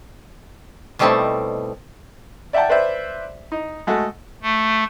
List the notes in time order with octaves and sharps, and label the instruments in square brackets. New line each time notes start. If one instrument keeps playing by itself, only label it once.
[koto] B2 G3 A3 C4 D#4 E4
[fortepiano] D5 E5 F#5 G5 A5
B4 C5 D5 E5
D#4
G#3 A3 F#4
[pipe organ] A3